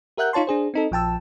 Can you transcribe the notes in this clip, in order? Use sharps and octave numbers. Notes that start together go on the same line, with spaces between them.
G4 A#4 E5 F#5 F#6 G6
D#4 F4 C#5 A5 C6
D4 G#4 C5
C4 D#4 A4
A#1 F3 G5 A5 E6